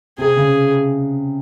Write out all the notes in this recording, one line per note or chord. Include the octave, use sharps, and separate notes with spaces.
C3 C4 G#4
C#3 C#4